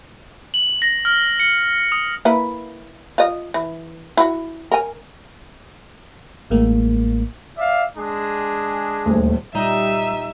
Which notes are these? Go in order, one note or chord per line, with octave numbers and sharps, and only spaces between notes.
F#7
A#6
F6
C#7
D#6
A#3 E4 B4
F4 D#5
E3
E4 F#4
A#4 G#5
A1 A2 G#3 A#3
D5 E5 F5
G#3 D4 G#4
D#1 D2
A#2 G3 D#4 E5